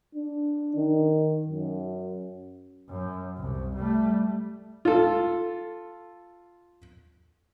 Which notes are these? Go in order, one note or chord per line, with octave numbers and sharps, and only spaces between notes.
D4
D#3
F#2
F#2
C2
G3 A3
F4 A4